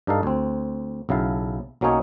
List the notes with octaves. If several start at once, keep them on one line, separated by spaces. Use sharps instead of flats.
G2 D4 D#4 A4 F5
D2 C4
B1 C#3 E4 F5 A5
B1 F#3 A#3 C#4 D#4 C#5